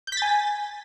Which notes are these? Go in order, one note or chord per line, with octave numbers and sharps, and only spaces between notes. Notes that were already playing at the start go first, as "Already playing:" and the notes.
G#5 G6 A6 B6